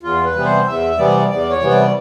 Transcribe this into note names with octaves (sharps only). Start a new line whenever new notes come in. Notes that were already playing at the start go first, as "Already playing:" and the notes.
E2 F4
B4
C3 E3 G3 B3
C5
E2 E5
C3 E3 G3 B3 D5
E2 D5
C#5
C3 E3 G3 B3
D5